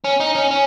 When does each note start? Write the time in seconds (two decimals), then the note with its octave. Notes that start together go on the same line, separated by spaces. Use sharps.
0.04 C#4
0.20 D#4
0.35 C#4
0.51 C#4